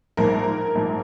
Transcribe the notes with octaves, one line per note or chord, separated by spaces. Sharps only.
A#1 G#2 F3 A#4
A#1 G#2 F3